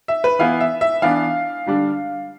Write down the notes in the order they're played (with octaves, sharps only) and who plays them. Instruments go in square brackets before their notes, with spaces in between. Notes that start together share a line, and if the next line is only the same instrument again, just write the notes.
[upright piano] E5
B4
E3 B3 E4 F5
E5
E5
E3 B3 D4 F5
D3 G3 D4